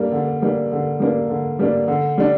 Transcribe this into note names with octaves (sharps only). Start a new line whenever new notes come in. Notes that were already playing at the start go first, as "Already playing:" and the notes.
Already playing: G3 A#3 D4
D3
G3 A#3 D4
D3
G3 A#3 D4
D3
G3 A#3 D4
D3
G3 D4